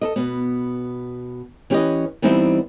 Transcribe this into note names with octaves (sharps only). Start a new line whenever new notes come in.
A4 B4 D#5
B2 B3
E3 C#4 G4 A#4 B4 D#5
E3 G3 B3 C4 D#4 E4